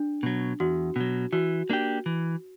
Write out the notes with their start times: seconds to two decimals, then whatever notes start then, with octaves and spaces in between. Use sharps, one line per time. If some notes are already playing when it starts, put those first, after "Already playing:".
Already playing: D4
0.23 B2 F#3
0.60 E2 F#4
0.96 B2 F#3
1.33 E3 F#4
1.70 A#3 D4 G4
2.06 E3